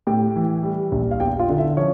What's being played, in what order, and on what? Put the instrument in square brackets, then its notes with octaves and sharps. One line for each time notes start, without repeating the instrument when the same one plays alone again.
[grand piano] A2 G4 G5
E3
G3
A#1
F5
E2 G4 G5
F4 F5
D3
E4 E5
F3 C#4 C#5